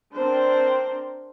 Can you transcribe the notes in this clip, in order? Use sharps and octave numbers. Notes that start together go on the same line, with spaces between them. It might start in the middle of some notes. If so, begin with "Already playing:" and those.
C4 D4 A#4 C5